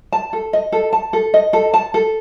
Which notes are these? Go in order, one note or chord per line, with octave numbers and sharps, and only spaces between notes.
A5
A4
D#5
A4
A5
A4
D#5
A4
A5
A4